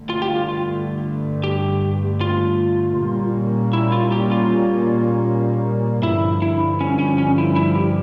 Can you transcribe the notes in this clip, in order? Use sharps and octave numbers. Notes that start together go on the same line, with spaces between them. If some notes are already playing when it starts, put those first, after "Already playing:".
Already playing: G2 D3 A3
F4
G4
F4
F4
G4
F4
A#2 G3 A#3 C#4
E4
F4
G4
F4
G2 D3 F3 E4
E4
C#4
C#4
C#4
E4
E4
G4